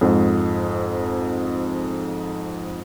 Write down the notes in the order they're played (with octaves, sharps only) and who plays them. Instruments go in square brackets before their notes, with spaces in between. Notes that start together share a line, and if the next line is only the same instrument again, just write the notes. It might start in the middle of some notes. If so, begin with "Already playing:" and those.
[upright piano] F2 G#2